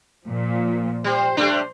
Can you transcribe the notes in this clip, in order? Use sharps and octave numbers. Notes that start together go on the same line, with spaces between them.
A#2 F3
G3 C5
G3 A3 D4